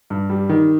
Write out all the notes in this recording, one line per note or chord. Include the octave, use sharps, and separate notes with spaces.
G2
G3
D#3